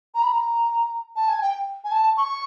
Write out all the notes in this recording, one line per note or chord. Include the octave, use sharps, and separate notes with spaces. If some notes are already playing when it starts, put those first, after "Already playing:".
A#5
B5
A#5
A5
G#5
G5
G#5
A5
C#6